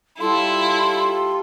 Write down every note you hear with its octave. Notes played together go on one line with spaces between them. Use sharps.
G3 E4 F4 A4 C6